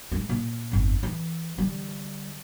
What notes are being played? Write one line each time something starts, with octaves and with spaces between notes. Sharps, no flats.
G#3 B3
A#2
G1 F2
E3
D3 G3